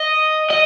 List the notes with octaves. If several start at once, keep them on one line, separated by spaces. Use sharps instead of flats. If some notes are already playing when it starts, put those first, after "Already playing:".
Already playing: D#5
D#5